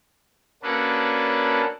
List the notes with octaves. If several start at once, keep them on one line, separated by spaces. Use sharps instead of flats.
A#3 C#4 D4 F#4 A4 B4